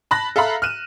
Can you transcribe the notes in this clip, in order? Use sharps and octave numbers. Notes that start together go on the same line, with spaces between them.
A5 B5 F#6 A#6
A4 E5 F5 A#5 B5
F6 F#6 D#7 E7